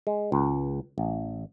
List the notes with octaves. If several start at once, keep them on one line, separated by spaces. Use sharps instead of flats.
G#3
C#2
A1